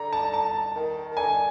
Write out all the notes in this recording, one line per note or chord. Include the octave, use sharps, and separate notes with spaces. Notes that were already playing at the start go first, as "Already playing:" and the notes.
Already playing: D3 A#5
A5
A5
D#3
D#3
D3 G#5